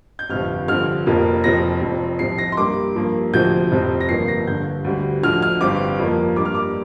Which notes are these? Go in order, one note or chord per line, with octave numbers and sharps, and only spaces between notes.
G6
G1 F2 C3 F6
G2 D3 F3 C4 F6
F1 F2 F3 A#3
F1 F2 F3 C4 A#6
F1 F2 F3 C4
C2 C3 F3 C4 C7
A#6
C6
G2 G3 A#3 D6
G2 F3 A#3
D2 C3 F3 C4 G6
F1 F2 C3 F3 C4
A#6
G1 G2 F3 A#3 C7
A#6
G1 G2 D3 G6
D2 D3 G3
D2 D3 F3 F6
F6
G1 G2 G3 C4 D6
F2 F3 A#3
G2 G3 A#3 D6
F6
D6